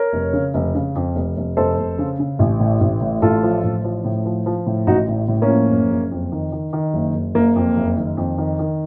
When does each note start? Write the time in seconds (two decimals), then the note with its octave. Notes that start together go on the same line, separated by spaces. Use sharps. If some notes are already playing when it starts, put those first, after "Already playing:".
Already playing: A#4 C#5
0.13 F1
0.33 C#3
0.54 F1
0.74 C#3
0.95 F2
1.16 F1
1.37 F1
1.57 F1 A4 C5
1.77 F1
1.98 C#3
2.19 C#3
2.39 A1
2.60 A2
2.81 A1
3.02 A2
3.22 A1 F4 A4
3.43 F3
3.63 A1
3.84 F3
4.05 A2
4.26 F3
4.46 F3
4.66 A2
4.87 A1 D#4 F#4
5.08 A2
5.28 A2
5.42 A#3 C#4
5.49 F3
5.70 F#1
5.90 F#1
6.11 F2
6.32 D#3
6.52 D#3
6.73 D#3
6.94 F#1
7.14 F#1
7.35 F#1 A#3
7.56 F2
7.77 F#1
7.97 D#3
8.17 F2
8.38 D#3
8.59 D#3